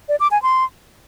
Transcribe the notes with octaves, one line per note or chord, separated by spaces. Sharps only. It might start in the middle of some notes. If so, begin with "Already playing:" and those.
D5
D6
G#5
C6